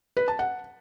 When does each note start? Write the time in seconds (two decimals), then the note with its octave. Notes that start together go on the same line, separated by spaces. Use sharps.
0.17 B4
0.28 A5
0.39 F#5